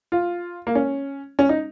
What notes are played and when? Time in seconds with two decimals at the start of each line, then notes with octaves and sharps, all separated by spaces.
0.12 F4
0.67 A#3
0.75 C#4
1.39 C#4
1.49 D#4